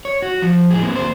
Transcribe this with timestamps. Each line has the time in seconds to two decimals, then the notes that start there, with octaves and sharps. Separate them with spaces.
0.05 C#5
0.22 F#4
0.42 F3
0.70 A2 G#4
0.83 A#3 C4
0.95 D2 C5